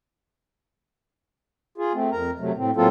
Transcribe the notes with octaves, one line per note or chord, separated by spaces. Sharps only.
F4 G#4
A3 C4
F2 A#4 A#5
C3 F#3 A3
A2 C4
A2 F#3 A#3 C4 F4 A4